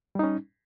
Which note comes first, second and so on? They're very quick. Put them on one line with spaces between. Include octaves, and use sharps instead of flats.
G3 D#4 C#4